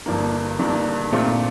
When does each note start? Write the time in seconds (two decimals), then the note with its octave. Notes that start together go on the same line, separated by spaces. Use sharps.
0.06 G1 G2 F3 A#3 D4
0.59 G1 G2 F3 A#3 D4
1.12 A#2 A3 C4 F4